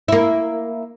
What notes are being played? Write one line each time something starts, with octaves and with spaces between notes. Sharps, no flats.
A#3 E4